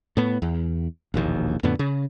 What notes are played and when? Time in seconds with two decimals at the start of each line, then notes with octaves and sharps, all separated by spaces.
0.17 A2 B3
0.42 E2
1.14 E1 A#1 D#2
1.63 F2 A2 D3 B3
1.79 C#3